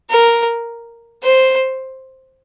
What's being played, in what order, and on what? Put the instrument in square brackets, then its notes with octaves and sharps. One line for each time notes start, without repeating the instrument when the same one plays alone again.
[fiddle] A#4
C5